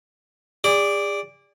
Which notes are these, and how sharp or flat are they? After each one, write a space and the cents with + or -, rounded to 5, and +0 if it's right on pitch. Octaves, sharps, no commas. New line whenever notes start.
G#4 -40 D5 -5